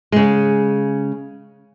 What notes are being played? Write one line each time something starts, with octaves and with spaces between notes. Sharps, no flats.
C#3 G#3